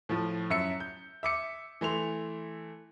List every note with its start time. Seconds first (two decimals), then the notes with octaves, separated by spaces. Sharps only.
0.09 A2 F3
0.50 F#2 E5 C#7
0.80 G6
1.23 E5 D6 C#7
1.81 E3 A3 C6 F7